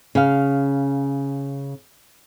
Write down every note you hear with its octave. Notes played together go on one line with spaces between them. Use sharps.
C#3 F5